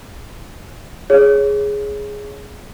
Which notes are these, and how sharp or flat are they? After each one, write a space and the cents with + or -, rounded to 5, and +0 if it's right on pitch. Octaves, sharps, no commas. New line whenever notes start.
G#4 +0 C#5 +0